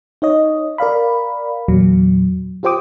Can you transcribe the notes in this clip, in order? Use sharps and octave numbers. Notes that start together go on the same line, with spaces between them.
D#4 C#5 D#5
A#4 D5 F5 B5
E2 A#2 F#3
F4 G4 C5 G5 D6 D#6